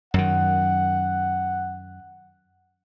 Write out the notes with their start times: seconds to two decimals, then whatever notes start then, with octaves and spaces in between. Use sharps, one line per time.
0.14 F#2 D#3 F#5